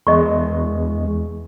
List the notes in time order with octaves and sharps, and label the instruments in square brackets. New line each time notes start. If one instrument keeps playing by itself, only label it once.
[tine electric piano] E2 G#3 [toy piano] D#5 C#6